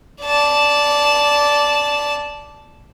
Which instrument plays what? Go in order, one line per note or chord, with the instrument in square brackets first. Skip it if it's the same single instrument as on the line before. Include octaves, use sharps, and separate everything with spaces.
[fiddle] D5 A5